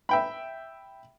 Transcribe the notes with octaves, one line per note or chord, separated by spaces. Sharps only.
E5 G5 B5